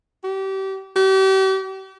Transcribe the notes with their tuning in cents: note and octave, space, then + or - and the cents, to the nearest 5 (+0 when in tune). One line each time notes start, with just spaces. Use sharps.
G4 -30
G4 -40